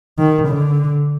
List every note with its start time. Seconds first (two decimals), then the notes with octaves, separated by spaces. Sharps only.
0.19 D#3
0.48 D3